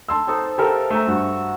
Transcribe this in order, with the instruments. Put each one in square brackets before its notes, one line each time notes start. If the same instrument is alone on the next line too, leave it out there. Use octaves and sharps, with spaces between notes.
[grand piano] A5 C6 E6
[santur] C4 D#4 A4
[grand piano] G4 A4 A#4 [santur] E5 F5 G5
[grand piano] A3 [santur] E5 G#5 A#5
[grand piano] G2 [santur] F#4